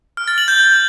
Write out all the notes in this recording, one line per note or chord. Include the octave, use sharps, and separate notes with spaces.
F6
A6
F#7
G6